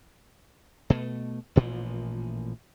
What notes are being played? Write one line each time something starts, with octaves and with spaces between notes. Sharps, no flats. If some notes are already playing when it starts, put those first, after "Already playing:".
B2 A3
A1 A#2 E3 F3